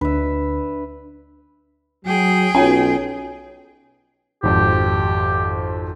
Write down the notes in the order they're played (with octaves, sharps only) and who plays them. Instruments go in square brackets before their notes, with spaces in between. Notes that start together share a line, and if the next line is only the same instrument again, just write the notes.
[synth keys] D2 [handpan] D4 [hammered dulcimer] B4 E5
[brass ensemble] F#3 [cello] G#4 G5
[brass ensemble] B1 [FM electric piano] C#4 F4 [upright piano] C#5 G#5
[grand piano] G#1 F2 [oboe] G4